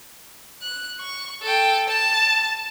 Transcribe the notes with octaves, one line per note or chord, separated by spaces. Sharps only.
F#6
C#6
A4 G5
A5